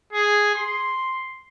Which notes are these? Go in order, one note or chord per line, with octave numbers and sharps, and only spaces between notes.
G#4
C6